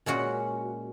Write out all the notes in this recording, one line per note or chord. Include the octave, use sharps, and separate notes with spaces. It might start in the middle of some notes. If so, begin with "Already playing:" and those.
A#2 G#3 C#4 F#4